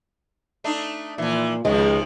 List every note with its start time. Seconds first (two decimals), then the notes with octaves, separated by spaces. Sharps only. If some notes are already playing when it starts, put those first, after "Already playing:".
0.64 A3 D4 D#4
1.18 A#2 E3 F3
1.65 C#2 C3 D#3 F3 G#3